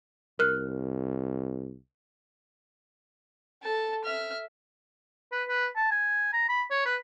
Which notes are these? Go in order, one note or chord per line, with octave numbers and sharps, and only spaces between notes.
C2 A#4 F6 F#6
A4 A5
E5 F6
B4
B4
A5
G#5
A#5
B5
C#5
B4